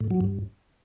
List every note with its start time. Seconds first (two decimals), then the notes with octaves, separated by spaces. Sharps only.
0.01 A2
0.11 F#3
0.21 G2